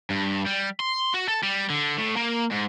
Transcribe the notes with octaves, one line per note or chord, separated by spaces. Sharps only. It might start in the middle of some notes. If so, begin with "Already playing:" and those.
G2
G3
C6
F#4
A4
G3
D3
A2
A#3
G#2